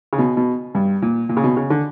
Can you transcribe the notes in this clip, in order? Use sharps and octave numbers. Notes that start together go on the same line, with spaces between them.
C#3
B2
B2
G2
A#2
A#2
C#3
B2
C#3
D3